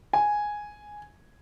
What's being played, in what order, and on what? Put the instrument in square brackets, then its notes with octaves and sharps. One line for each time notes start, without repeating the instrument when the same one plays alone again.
[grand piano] G#5